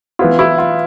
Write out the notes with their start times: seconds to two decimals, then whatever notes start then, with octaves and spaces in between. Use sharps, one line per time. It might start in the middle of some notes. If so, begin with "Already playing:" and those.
0.19 E3 B3 E4 F4
0.39 E4
0.58 F4